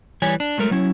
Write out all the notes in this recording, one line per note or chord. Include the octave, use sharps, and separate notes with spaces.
E3 G3 C#5 G#5
D4
F#3 G#3 A3 A#4
F#3 C#4 E4